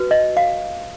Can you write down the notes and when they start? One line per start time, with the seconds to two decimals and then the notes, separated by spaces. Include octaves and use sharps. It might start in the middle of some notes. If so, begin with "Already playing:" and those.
Already playing: F#4 B4
0.11 D#5
0.37 F5